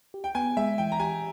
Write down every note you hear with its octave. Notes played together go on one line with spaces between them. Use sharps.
G4
G5
B3 G#5
G#3 E5
E3 G5
A#5
G4 G#5